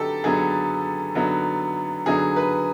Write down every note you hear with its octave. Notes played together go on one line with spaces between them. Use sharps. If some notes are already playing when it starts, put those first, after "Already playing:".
Already playing: D3 F#3 B3 D#4 G4 A4
D3 F#3 B3 D#4 G#4
D3 F#3 B3 D#4
D3 F#3 B3 D#4 G#4
B4